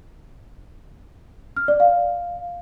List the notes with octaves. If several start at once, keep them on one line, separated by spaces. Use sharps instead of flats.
F6
D5
F5